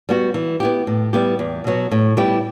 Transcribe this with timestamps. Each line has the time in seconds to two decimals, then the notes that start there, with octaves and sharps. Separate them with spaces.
0.09 G3 B3 F#4
0.34 E3
0.60 B3 E4 G4
0.87 A2
1.13 G3 B3 E4 G4
1.39 E2
1.64 B2 F#3 B3
1.92 A2
2.17 G3 B3 E4 G4